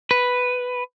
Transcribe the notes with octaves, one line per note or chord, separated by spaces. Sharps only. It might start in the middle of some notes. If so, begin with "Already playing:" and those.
B4